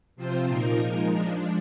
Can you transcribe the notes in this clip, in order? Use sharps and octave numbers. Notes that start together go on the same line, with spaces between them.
C3 F3 C4 F4 C5
A#2 F3 A#3 D#4 A#4
F3 G#3 D#4 A#4
F3 G#3 D4